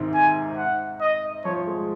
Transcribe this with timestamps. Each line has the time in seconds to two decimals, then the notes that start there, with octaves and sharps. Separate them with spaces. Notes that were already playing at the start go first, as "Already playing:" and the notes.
Already playing: G#2 C3 D#3
0.14 G#5
0.57 F#5
1.01 D#5
1.45 F3 C#5
1.67 G#3